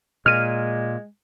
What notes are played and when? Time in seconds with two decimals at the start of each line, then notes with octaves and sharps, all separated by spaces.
0.26 A#2 G#3 F6 D#7